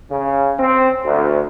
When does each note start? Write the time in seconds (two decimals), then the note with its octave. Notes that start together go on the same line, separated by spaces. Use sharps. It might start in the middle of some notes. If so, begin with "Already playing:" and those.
0.11 C#3
0.59 C4
1.06 D2